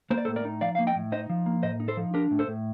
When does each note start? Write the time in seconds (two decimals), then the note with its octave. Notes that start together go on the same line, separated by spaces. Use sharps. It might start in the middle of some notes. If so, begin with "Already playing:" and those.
0.11 A#3 C5
0.18 D5
0.25 A4 C5
0.28 A2
0.36 A#4 D5
0.45 D#4
0.61 F3 D5 F5
0.75 A#3 F5
0.87 D#5 G5
0.96 A2
1.12 D#4 C5 D#5
1.30 F3
1.46 A#3
1.63 A2 C5 D#5
1.80 D#4
1.88 A4 C5
1.97 F3
2.14 D4 G4 A#4
2.31 A2
2.39 A4 C5
2.48 A2